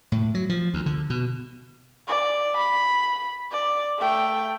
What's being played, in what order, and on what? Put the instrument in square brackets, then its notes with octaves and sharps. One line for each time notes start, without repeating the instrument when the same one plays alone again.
[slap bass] A2
F#3
F3
D2
D3
B2
[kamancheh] D5
B5
D5
A3 G5